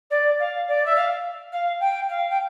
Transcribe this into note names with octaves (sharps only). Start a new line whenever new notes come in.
D5
F5
D5
E5
F5
F5
G5
F5
G5